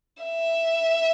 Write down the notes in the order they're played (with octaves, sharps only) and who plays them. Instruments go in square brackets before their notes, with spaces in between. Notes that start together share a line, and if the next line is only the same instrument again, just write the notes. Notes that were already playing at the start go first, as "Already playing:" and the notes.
[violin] E5